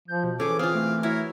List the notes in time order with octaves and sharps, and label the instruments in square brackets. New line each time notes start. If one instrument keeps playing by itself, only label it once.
[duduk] F3 [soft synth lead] G6
[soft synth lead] B2
[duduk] E3 [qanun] C#4 G#4 [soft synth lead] A4 [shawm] D6
[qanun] C4 F4 [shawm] F5 [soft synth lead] D#6
[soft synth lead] A3
[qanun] E4 F#4 C#5 [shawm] A#4